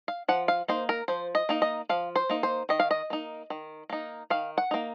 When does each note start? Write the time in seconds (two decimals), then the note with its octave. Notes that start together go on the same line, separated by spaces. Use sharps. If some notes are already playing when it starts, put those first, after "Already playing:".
0.08 F5
0.28 F3 F#5
0.48 F5
0.68 A#3 D#4 C5
0.89 A#4
1.08 F3 C5
1.35 D#5
1.49 A#3 D#4
1.62 D#5
1.89 F3 F5
2.16 C5
2.29 A#3 D#4
2.43 C5
2.69 D#3 D#5
2.80 F5
2.91 D#5
3.10 A#3 D#4
3.50 D#3
3.90 A#3 D#4
4.30 D#3 F5
4.58 F#5
4.71 A#3 D#4